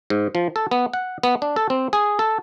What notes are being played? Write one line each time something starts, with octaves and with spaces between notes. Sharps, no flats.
G#2
F3
A4
B3
F#5
B3
D4
A4
C4
G#4
A4